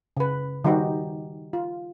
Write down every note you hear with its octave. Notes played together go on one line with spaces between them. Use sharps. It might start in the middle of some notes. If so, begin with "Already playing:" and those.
C#3 B4
D#3 G3 D#4 F#4 G4 C5
F4